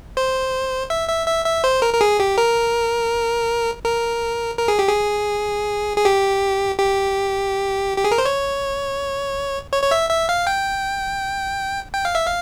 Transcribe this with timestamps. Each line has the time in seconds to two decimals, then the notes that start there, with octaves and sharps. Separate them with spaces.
0.17 C5
0.90 E5
1.09 E5
1.27 E5
1.45 E5
1.64 C5
1.82 A#4
1.94 A#4
2.01 G#4
2.20 G4
2.38 A#4
3.85 A#4
4.58 A#4
4.68 G#4
4.79 G4
4.89 G#4
5.97 G#4
6.05 G4
6.79 G4
7.97 G4
8.04 G#4
8.11 A#4
8.18 C5
8.26 C#5
9.73 C#5
9.83 C#5
9.91 E5
10.10 E5
10.29 F5
10.47 G5
11.94 G5
12.05 F5
12.15 E5
12.26 F5